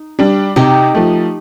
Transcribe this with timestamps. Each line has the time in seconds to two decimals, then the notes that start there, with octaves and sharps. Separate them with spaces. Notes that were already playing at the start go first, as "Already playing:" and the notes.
Already playing: D#4
0.19 G3 D4
0.56 C3 D#4 G4
0.95 F3 A3